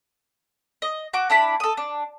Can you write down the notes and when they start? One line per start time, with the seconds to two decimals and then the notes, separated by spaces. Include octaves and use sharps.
0.82 D#5
1.14 F#4 D6
1.30 D4 E4 A5 B5
1.60 A4 D#6
1.77 D4